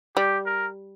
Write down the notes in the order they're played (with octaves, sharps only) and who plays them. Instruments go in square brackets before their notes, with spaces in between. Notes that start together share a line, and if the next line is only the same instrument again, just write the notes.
[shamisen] G3 [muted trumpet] G4
[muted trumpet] A#4